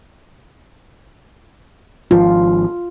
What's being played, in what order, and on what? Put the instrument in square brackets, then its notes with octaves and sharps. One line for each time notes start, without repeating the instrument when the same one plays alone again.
[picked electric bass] G#1 F3 [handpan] F4